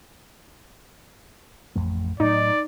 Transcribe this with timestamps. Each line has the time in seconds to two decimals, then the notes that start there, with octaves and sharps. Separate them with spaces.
1.76 A1 F2 A3
2.20 A2 F#3 D#4 D5